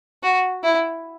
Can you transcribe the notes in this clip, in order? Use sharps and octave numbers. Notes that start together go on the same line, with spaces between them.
F#4
E4